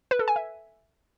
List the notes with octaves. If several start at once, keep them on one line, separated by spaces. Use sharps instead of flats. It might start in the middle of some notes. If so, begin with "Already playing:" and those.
B4
A4
G#5
E5